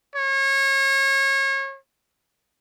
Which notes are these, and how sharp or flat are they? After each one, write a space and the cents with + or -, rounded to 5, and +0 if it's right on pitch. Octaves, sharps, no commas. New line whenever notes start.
C#5 -30